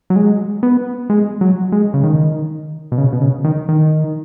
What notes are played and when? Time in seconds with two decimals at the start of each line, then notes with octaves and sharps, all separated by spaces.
0.10 F#3
0.16 G#3
0.63 B3
1.10 G#3
1.41 F#3
1.72 G#3
1.94 C#3
2.04 D#3
2.92 B2
2.98 C#3
3.13 B2
3.21 C#3
3.44 D#3
3.69 D#3